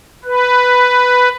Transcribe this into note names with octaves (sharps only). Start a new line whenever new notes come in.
B4